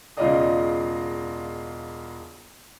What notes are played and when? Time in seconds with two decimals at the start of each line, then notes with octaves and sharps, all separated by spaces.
0.17 E1 C#3 F4 D5 D#5 D#6